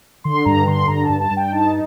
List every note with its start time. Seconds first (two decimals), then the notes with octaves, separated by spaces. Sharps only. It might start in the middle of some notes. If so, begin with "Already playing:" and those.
0.24 D3 C6
0.45 G2 A#5
0.67 D3 C6
0.88 G2 A#5
1.04 A5
1.09 G2
1.20 A5
1.31 G2
1.36 G5
1.52 D#4 A5